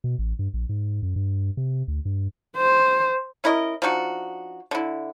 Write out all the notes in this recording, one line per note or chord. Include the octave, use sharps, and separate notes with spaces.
B2
A1
G2
A#1
G#2
F#2
G2
C3
D2
G2
C5
C#4 E4 A#4 D#5
F3 D4 D#4 F#4
D3 E4